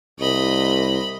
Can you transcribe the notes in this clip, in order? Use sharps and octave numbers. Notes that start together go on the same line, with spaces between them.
C2 D#5 B5